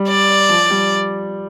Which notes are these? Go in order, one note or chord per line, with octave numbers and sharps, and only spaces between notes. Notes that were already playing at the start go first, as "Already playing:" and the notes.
Already playing: G3
D5
F3
G3